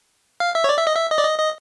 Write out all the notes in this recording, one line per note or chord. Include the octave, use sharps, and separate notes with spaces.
F5
E5
C#5
D5
E5
D#5
E5
D#5
D5
D#5
D#5